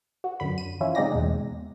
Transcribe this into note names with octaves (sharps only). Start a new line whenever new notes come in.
F#4
F#2 D3 B5
D#7
E3 F3 C#4 E4 F4
C#3 G#3 C4 D#4 D5 A#6
E2 B2 G#3